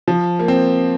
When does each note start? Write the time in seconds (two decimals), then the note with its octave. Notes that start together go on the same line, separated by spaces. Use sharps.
0.08 F3
0.39 A#3
0.48 C4